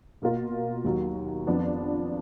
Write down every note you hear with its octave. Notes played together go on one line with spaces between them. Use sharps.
B2 A#3 F4 A#4
D#2 D#3 F#3
F2 F3 B3 D4